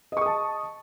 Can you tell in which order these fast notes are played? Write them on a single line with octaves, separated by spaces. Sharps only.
D#5 C#6 D#6 A5